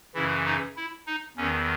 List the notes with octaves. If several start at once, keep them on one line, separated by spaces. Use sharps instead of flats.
F#2 C#3 E3 E4
D#4
E4
D#4
E2 D#3 C#4